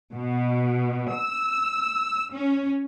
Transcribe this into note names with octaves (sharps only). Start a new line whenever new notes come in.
B2
E6
C#4